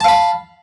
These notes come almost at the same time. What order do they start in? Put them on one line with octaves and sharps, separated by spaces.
A5 F5 B5